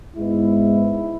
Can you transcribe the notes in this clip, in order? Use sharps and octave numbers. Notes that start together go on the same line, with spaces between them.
G#2 G#3 B3 E4